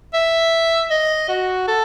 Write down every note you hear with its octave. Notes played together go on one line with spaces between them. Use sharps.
E5
D#5
F#4
A4